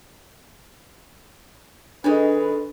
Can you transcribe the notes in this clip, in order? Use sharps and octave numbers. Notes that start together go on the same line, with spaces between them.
D#3 G#3 C#4 D4 A4 B4